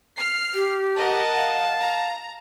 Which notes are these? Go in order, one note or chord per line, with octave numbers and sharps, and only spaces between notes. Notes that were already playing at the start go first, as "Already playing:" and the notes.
F6 C7
G4
A#4 D#5 F#5 A5
F5
A#5